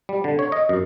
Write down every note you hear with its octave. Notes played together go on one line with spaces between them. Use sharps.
G3
D3
C#5
D#5
F#2